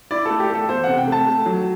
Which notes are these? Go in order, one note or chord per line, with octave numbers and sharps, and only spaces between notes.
E4 D5
A3 A4
G4
A3 A4
E2 C5
C3 F#5
G5
A3 A5
A3
F#3